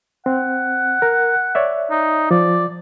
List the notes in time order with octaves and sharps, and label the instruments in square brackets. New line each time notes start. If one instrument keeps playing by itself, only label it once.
[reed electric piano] C4 [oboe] F#5
[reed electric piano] A#4
C#5 D5 E5
[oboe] D#4
[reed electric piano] F3 [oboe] D5